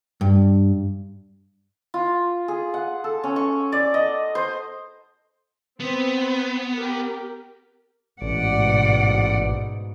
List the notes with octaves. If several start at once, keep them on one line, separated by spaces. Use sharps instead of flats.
G2
F4
G#4
F#5
A4
C#4
C#6
D5
D#5
C5
B3 C4
G4 A#4
A1 G#2 B2 D5 F#5